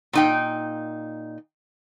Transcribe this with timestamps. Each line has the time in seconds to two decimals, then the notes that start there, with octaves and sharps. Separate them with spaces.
0.13 A#2 D#4 G5